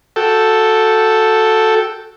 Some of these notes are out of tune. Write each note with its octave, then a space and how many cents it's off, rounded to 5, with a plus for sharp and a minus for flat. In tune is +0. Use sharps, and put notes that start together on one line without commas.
F#4 -10 A4 +0 G5 -5